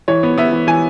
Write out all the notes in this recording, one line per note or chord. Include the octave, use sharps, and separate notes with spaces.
E3 C#5
B3
B3 E5
E3
E3 G#5